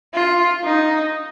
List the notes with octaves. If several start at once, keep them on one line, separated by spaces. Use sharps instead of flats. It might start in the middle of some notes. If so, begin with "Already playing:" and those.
F4
D#4